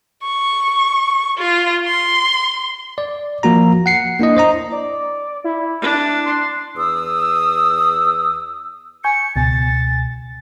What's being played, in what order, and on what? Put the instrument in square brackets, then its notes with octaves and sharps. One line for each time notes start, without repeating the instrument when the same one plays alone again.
[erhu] C#6
F4
C6
[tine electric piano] D5
F3 A#3 F#4 A#5
F#5 C7 C#7
A#3 D4 E4 D#5
C5 D#5 A#5
[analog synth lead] D5
E4
[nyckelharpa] D4
[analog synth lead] C6
[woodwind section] E2 D#6 E6
[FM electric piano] G#5 C#6 G6 [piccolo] C#7
[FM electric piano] C#2 B2 G#5 [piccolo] A6